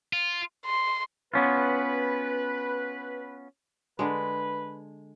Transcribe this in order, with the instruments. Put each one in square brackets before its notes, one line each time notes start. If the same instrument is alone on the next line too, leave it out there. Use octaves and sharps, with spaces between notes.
[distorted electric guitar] F4
[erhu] C6
[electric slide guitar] B3 C#4 F4 [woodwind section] B4
[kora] D3 G#3 [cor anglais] B4